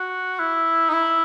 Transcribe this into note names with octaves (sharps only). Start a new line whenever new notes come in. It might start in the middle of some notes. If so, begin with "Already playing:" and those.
Already playing: F#4
E4
D#4
E4